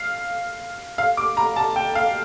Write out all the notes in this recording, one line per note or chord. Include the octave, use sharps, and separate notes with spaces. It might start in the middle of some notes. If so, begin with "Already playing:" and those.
Already playing: F5
F5
D6
A#5
A5
G5
F5